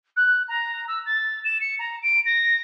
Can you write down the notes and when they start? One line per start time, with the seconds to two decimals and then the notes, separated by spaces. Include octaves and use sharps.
0.16 F#6
0.48 A#5
0.87 E6
1.06 A6
1.44 E7
1.60 C#7
1.79 A#5
2.02 D7
2.25 A#6